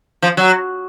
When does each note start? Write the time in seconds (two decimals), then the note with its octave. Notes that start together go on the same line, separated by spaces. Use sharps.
0.22 F3
0.37 F#3